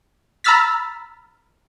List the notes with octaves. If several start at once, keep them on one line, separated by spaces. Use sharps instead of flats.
A#5 B5 E6 F6 A6 B6